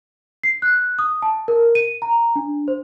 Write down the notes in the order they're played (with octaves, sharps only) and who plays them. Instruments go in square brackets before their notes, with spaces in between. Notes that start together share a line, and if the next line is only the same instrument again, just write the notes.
[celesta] C7
F#6
D#6
A5
A#4
D#7
A#5
D4
C5